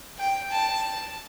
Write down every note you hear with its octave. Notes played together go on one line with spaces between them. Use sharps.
G5
A5